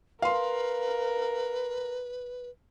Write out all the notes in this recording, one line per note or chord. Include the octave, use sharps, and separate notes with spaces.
A#4 B4 F5 C6